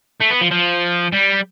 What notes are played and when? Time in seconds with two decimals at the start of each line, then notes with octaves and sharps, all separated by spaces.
0.20 A3
0.30 B3
0.41 F3
0.51 F3
1.13 G3